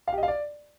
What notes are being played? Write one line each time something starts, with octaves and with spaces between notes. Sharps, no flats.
F5
G4
D#5
F5
D5